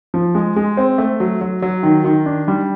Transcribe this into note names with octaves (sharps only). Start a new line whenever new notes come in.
F3
G#3
G#3
C4
A3
F#3
F#3
F#3
D#3
D#3
D4
G3